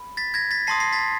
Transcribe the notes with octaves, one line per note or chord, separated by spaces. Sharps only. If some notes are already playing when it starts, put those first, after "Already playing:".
Already playing: B5
A6 B6
G#6 A#6
A6 B6
A5 C6 D#6 A#6 C7
A#6 C7
A6 B6